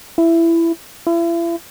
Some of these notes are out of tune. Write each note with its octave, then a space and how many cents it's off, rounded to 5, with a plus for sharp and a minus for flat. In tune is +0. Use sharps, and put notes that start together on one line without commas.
E4 +15
E4 +40